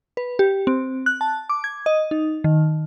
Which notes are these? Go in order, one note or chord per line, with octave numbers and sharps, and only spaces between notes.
B4
G4
C4
F#6
A5
D6
G#6
D#5
D#4
D#3